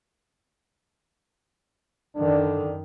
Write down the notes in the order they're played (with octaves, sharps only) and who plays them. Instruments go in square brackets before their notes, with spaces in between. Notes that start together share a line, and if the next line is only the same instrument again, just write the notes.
[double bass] F#2 D#3 [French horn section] D3 D4